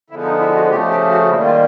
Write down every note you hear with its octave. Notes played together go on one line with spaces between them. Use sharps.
D3 F3 G#3 B3 E4
D#4
E4
F#4
C#3 F3 A3 G4
G4
F#4
D#3 G3 A#3 E4
F4